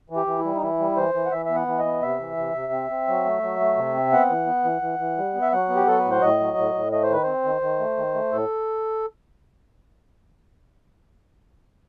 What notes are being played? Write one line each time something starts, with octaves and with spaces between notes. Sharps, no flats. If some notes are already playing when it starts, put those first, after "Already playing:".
E3
G4
E3
E4
G3
D#4
E3 E4
G3
E3 C5
E3
F#5
E3 E5
B3 E5
F#5
E3
D#5
B3
C3 E5
E3
C3
C3
C4
C4
F#3
A3
F#3
A3
C3
C4
B3 F#5
E3
B3
E3
E3
E3
G3
B3
E5
F#3 F#5
B3
G4
F#3 A4
B4
A2
C5
A2 D#5
F#3
A2
A2
A3 D#5
C5
D#3 B4
C4 C5
D#3
D#3
A3
D#3
A3
A2 A4